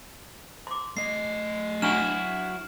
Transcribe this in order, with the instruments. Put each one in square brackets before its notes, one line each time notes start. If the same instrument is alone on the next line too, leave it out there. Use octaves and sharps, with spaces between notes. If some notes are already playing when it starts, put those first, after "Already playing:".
[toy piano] C6 D6
[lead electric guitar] A3 D#5 [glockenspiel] C7
[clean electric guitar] F#3 E4 F#4 [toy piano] D4 F#5 C#6 [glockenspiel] F6 E7